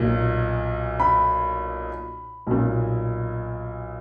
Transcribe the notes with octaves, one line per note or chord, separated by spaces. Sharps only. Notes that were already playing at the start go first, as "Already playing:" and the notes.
Already playing: B1 A#2
B5
B1 A#2